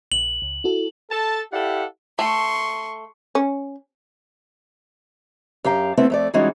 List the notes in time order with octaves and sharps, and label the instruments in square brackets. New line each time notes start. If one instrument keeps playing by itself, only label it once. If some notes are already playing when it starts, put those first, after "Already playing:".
[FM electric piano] A#1 [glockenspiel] F#7
[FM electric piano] C#2
E4 F#4 A4
[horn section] A4 A5
E4 G4 A4 D5 F5 F#5
[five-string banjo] A3 [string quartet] C6 C#6
[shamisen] C#4
[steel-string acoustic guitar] F#2 G4 F5 A#5
A3 B3 C4 E4 A4
F2 A3 D5
E3 G3 G#3 C#4 D#4 F#4